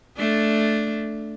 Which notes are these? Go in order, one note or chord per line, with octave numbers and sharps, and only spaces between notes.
A3 D4